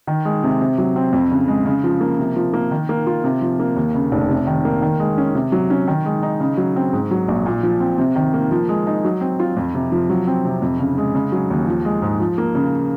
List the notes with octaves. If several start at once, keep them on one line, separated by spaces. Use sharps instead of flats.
D#3
G#3
C3
C3
F#3
C4
F2
C#3
G#3
C#3
F3
A#3
C3
F3
A#3
D#3
A#3
F4
C3
F3
A#3
D#2
C#3
F1
C3
D#3
A#3
D#3
G#3
C#4
C3
F#3
C#4
D#3
G#3
D#4
C#3
F#3
C4
G#2
F#3
A#1
A#2
F3
C4
C3
D#3
A#3
F3
G#3
D#4
F#3
C4
F4
F2
C3
F3
F#3
C4
C3
F2
C#3
G#3
C#3
F#3
D#2
F3
G#3
G#2
F3
A#3
C#3